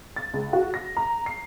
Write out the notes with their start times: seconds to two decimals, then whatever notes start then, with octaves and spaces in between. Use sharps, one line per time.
0.16 A6
0.34 C#2
0.53 F#4
0.74 A#6
0.97 A#5
1.26 C7